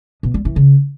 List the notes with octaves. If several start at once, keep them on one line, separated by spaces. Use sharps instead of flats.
B2
G3
E3
C#3